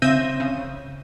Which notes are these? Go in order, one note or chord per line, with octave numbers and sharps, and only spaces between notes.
C#3 C4 E5 G6 A#6 D#7
C#3